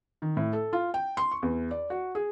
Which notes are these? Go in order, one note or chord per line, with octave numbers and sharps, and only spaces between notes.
D#3
A2
A4
F4
G5
C6
C#6
E2
D5
F#4
G#4